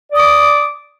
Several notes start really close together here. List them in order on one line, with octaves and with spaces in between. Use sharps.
D5 D#6 D6